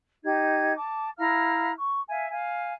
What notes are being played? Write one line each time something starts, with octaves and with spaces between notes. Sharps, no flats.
D#4 G4 G#6
A5 D6
E4 F5 A#5 F6
C#6
E5 F5 G#5
F5 G#5